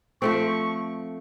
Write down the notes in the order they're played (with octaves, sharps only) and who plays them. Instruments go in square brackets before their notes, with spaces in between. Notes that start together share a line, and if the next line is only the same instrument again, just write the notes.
[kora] F3 A3 C4 [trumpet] C#6